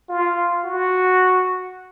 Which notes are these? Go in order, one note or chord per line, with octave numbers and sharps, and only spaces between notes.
F4
F#4